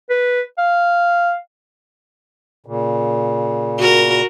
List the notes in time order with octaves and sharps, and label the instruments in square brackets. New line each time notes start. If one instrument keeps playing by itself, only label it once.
[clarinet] B4
F5
[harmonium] A#2 C#3
[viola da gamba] F#4 A#4